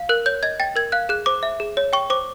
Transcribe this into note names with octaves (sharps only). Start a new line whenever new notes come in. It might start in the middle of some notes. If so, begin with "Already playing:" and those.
Already playing: F5
A#4 F#6
C#5 G6
D#5 G#6
G5 A6
A#4 G#6
F5 F#6
G#4 F#6
C5 D6
E5
G#4
C#5
G5 C#6
C5 D6